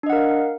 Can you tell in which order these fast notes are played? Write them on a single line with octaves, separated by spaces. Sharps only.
D4 D#5 F#5 A#4 F5